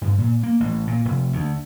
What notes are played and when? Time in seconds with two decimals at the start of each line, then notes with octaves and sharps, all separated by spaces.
0.02 G2
0.18 A#2
0.43 A#3
0.60 A1
0.87 A#2
1.05 F1
1.32 D2